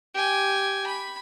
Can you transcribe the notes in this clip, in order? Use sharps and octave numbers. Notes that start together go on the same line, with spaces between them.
G4 G#5
B5